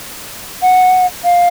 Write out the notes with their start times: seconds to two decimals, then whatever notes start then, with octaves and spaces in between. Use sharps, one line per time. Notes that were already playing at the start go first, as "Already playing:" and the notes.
0.62 F#5
1.24 F5